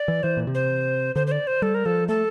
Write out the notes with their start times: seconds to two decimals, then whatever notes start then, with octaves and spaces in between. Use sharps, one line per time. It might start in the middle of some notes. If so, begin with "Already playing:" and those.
Already playing: D5
0.08 E3
0.23 E3 C5
0.37 A#2
0.47 C3
0.55 C5
1.16 D3 C5
1.27 C5
1.32 D5
1.47 C5
1.62 G3 A4
1.75 A#4
1.86 F3 A4
2.08 A3 A4